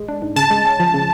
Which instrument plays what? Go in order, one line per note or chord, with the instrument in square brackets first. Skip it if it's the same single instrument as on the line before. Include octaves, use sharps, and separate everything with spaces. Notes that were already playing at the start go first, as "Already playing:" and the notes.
Already playing: [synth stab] A1 G#3
D4
G#2
[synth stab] C#3 [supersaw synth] A5
[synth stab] G#3
C#4
F3
C#3